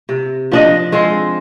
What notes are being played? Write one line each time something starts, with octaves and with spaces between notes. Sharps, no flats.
C3
F3 D4 D#5
G#3 C4 F4